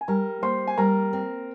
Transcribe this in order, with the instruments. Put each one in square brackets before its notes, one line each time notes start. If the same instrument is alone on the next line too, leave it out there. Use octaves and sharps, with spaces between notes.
[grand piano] G#5
[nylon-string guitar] G3 [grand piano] A#4 A#5
[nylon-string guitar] A#3 [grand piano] C5 C6
[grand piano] G#5
[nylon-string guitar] G3 [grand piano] A#4 A#5
[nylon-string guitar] C4